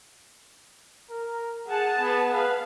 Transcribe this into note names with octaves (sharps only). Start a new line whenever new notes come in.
A#4
G#4 F#5 A5
B3
B4 F5